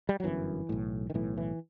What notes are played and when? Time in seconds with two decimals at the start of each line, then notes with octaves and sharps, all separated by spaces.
0.09 G3
0.20 F#3
0.24 G1 F#2 E3
0.69 B1 A2
1.10 D#3
1.14 B1 A2 E3
1.37 E3